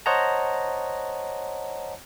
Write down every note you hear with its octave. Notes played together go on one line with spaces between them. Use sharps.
C5 C#5 D#5 F#5 A5 A#5